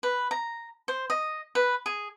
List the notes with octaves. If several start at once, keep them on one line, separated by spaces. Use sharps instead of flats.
B4
A#5
C5
D#5
B4
G#4